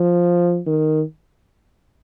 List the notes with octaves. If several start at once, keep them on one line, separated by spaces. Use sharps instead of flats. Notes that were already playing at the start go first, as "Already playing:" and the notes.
Already playing: F3
D#3